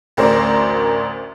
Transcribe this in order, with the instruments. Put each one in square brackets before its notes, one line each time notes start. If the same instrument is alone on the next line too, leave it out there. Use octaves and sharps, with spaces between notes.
[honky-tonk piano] A1 D2 A#4 C5 D5